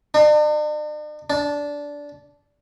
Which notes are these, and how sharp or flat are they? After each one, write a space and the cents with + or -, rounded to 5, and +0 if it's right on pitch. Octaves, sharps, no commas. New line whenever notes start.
D4 +45
D4 -15